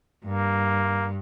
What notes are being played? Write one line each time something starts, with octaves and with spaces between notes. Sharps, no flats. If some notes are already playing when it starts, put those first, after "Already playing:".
G2 A#3